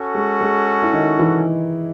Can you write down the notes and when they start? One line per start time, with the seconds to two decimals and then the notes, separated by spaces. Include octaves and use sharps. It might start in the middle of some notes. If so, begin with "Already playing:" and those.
Already playing: C#4 F#4 A4
0.15 G#3
0.41 G#3
0.82 E4
0.93 D#3 D#4
1.19 E3 E4